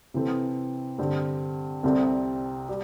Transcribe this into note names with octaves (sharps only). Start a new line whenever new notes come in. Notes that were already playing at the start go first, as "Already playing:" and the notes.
C3 E3 C4 A4
G2 D3 C4 G4
C2 C3 G3 C4 A4
G3